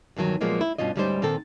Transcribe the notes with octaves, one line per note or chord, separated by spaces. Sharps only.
E2 G2 D#3 F#3
A#2 F3 F#3 G#3 A#3 B3
E4
G2 B2 C#4 F4 D#5
D2 G#2 G3 C#4 D#4 C5
A#2 D#3 C4 A4